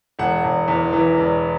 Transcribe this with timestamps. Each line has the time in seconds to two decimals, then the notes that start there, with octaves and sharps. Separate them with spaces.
0.19 E1 F#5
0.44 E1
0.68 E2
0.93 E3
1.17 E1